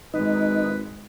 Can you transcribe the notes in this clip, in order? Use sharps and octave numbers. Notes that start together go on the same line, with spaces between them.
G#1 G#2 G#3 D#4 B4